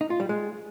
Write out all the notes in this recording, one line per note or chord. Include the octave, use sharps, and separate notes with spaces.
D#4
F4
G3
G#3